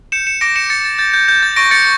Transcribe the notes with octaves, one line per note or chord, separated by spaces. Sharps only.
G6 C#7 E7
C#7 E7
D6 A#6 D7
C#7 E7
D6 A6 C#7
A6
G6 A6
G6
G6
A6
C#6 A#6 D7
A6 C#7